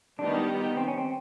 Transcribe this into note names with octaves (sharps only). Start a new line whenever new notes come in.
D#3 G3 B3 D4 D#4 G4
C4
C#4
C4